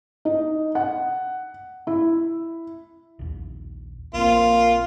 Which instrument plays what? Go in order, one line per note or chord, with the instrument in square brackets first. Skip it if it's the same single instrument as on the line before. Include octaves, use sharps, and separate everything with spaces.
[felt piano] D#4
F#5
E4
[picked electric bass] A#1 D#2
[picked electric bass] A#1 C4 [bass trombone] A#3 [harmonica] F4